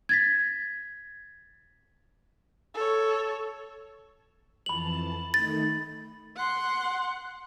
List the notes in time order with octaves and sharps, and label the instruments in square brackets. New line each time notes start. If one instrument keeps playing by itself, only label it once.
[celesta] G#6 A6 B6
[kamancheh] A4 C#5
[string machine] F2 E3 A5 [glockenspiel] B5 F#7
[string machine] D#3 A3 D#4 [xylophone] A6
[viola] F#5 C6